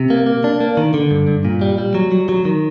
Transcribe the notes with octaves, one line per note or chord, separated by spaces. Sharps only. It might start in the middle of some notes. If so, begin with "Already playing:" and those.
Already playing: C3
A#3
A#3
D4
A#3
D#3
D3
G2
G2
A#2
G3
G3
F#3
F#3
F#3
D#3